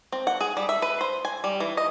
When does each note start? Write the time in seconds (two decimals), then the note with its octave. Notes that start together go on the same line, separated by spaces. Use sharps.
0.12 C4
0.27 F#5
0.41 G#4
0.57 G3
0.69 E5
0.82 B4
1.01 C5
1.25 G#5
1.44 G3
1.60 E3
1.77 D#5